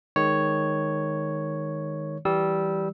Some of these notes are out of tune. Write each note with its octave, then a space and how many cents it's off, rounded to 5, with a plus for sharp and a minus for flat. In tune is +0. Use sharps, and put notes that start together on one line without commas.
D#3 +0 G#3 +0 C#5 +0
E3 +0 G3 -10 E6 -25